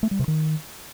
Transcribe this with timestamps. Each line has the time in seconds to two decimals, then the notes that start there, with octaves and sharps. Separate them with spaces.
0.03 A3
0.11 G3
0.19 C3
0.28 D#3